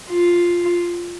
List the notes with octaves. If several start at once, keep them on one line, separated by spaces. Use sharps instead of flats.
F4